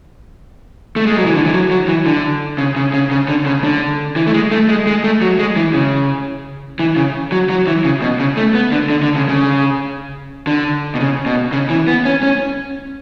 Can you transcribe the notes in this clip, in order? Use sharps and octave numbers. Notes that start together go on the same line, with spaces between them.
A3
G#3
F#3
E3
D3
E3
F#3
F#3
E3
D3
C#3
C#3
C#3
C#3
D3
C#3
D3
E3
A3
G#3
A3
G#3
G#3
A3
F#3
G#3
E3
C#3
E3
C#3
F#3
F#3
E3
C#3
B2
C#3
A3
B3
D3
D3
D3
C#3
C#3
D3
B2
C#3
B2
C#3
E3
B3
C#4
C#4